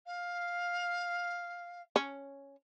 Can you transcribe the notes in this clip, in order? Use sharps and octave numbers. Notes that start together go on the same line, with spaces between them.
F5
C#4